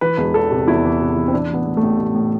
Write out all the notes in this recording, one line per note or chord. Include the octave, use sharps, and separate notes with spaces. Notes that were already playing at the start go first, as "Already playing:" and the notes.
E3 B4
E1
E2 A4
C3
E2 E4
E3
C3
E3
C4
E3 D4
A1 B3
A2
A3
A1
A1
A2